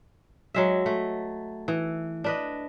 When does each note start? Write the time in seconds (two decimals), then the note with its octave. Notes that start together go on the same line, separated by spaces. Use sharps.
0.54 F#3 G#3 E5
0.86 A3
1.68 E3
2.24 D4 B4 D#5